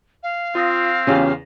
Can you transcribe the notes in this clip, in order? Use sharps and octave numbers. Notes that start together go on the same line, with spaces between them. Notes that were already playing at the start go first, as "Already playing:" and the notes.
F5
C4 F4 D#6 A#6
E2 C#3 C#4 F4 G4